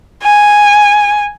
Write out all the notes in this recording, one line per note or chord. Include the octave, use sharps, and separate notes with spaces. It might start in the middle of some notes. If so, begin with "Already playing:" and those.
G#5